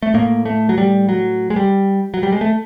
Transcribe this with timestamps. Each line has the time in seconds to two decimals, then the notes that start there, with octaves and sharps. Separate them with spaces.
0.02 A3
0.14 A2 A#3
0.45 A3
0.69 F#3
0.78 G3
1.09 F#3
1.50 G#3
1.56 G3
2.14 F#3
2.23 G3
2.32 G#3
2.41 A3